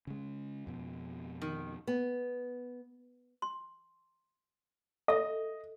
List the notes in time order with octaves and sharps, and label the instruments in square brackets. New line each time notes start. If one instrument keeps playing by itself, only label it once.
[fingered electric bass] C#3 G#3
F2 B2
[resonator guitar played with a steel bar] D#3
[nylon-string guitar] B3
[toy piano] C6
[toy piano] A4 E5 [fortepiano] D#5